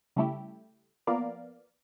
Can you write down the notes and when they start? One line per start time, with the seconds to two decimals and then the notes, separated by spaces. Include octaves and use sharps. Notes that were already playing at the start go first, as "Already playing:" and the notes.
0.16 C#3 G3 A3 E4 G4
1.07 F3 A#3 B3 A#4 D5 F5